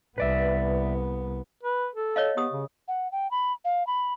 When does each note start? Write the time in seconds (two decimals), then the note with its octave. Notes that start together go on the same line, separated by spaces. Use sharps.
0.18 C2 B3 B4 D5 E5
1.63 B4
1.95 A4
2.16 C#5 D#5 F5
2.37 B3 G4 D#6
2.52 C#3
2.88 F#5
3.12 G5
3.31 B5
3.65 F5
3.87 B5